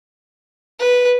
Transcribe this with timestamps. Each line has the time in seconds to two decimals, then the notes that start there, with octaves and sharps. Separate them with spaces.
0.80 B4